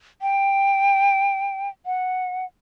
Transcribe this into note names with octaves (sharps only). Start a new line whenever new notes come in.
G5
F#5